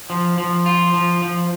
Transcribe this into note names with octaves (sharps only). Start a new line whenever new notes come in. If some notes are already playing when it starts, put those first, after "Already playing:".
F3
F3
F4
F3
F3